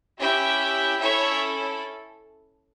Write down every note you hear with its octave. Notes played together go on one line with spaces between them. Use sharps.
C#4 E4 G4 E5 G5
C#4 E4 A4 C#5 E5